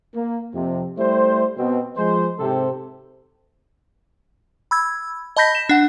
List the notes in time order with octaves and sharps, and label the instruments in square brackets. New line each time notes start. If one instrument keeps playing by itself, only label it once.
[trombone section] A#3
F2 C3
G3 A3 E4 C5
B2 C4
F3 G#3 C5
G#2 C3 C4 G4 A4 C5
[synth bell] B5 E6 G#6
D#5 A5 B5 G6 A#6 B6
E7
D4 F#5